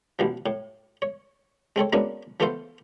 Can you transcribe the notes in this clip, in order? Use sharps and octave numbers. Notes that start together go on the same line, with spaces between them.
A1 B2 F3
A2
C#5
G#3 C4 A4 C#5
G#3 A#3 B3 C#4 D4 F#4
E3 A3 B3 F4 A4 C5